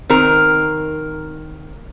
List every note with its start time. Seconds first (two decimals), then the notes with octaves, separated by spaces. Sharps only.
0.10 D#3 C4 A#4